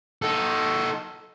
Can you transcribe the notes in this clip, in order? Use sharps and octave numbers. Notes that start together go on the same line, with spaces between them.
D#4 A4